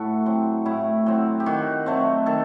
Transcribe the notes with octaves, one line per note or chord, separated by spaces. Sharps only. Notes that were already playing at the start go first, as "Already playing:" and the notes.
Already playing: A2 F#4 A4 B4
F#3 C4
A2 E4
F#3 C4
G4
D#3 F#4
F#3 A3 C4
D#3 A4